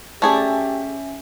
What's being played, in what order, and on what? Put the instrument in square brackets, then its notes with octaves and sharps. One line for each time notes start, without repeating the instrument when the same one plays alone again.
[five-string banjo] A3 G#4 D5 [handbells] C#4 E5 [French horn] G4